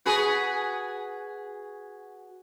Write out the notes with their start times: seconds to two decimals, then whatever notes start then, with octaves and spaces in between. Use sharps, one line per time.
0.06 F#4 G#4 B4